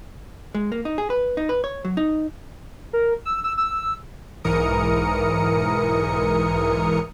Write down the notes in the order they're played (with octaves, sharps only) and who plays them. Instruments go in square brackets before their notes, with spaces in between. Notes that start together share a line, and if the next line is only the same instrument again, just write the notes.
[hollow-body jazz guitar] G#3
A#3
D#4
G#4
B4
D#4
B4
C#5
F#3
D#4
[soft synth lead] A#4
E6
E6
E6
[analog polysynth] B1 G#2 E3 A#4 D#6 C#7